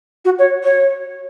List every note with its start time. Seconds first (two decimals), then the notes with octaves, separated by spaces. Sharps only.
0.25 F#4
0.39 C#5
0.64 C#5